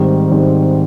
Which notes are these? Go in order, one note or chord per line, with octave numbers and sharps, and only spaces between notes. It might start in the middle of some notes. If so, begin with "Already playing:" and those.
Already playing: G#2 D#3 G3 C4
G#2 D#3 G3 C4